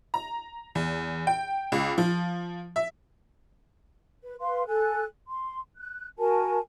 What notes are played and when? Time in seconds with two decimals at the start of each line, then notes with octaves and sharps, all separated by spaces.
0.14 A#5
0.75 E2
1.27 G5
1.72 C#2
1.98 F3
2.76 E5
4.23 B4
4.40 B4 F5 C6
4.67 A4 G#5 F#6
5.27 C6
5.77 F#6
6.18 F#4 A#4 G#5 A5